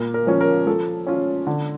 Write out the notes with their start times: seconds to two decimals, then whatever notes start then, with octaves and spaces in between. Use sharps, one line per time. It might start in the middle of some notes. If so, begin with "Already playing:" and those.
Already playing: A#2 A#4
0.14 A#4
0.27 F3 C#4
0.41 A#4
0.67 F3 A4
1.07 C#4 F4
1.47 D3